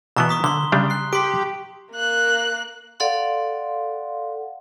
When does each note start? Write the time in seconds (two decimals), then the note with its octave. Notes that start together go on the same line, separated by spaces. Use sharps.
0.17 B2 E3 B3 A#5 C#6
0.29 C#6 D#6 B6
0.44 D3 C6 G7
0.72 C#3 G3 D4
0.90 F#6 C7
1.13 G4 C6 B6 D7
1.92 A#3 F#6
3.00 A4 D5 F5 F#5 C6